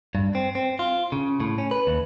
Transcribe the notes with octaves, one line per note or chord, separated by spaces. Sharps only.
G2
C4
C4
F4
C#3
A2
C#4
B4
D#2